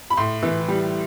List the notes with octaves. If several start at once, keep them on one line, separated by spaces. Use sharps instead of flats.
B5
A2 C6
E3
G3